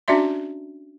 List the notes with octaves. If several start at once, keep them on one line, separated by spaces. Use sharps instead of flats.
C#4 D4 F#4 D5 E5 C6